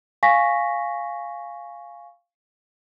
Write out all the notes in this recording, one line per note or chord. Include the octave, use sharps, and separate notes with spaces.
F5 G#5 C#6 A#6 B6